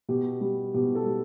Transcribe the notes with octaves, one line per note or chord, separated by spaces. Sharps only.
B2 G4
G3
B2 G4
A4
G3